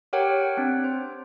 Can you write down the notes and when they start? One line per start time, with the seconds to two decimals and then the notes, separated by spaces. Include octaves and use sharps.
0.13 G4 A#4 C#5 F#5 G5
0.57 C4 D4
0.84 C5